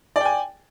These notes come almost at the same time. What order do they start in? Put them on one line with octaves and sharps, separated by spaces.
D5 G5 G#5